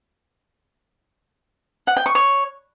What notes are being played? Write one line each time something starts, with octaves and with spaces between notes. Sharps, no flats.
F#5
G5
C#6
C#5